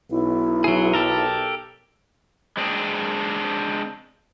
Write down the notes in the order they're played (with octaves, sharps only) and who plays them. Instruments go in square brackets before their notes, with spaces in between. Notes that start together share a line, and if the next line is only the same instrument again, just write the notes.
[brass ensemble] B1 [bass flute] E4
[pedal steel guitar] F#3 G#4
G4 A4 A#4
[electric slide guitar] G#3 C4 D4 G#4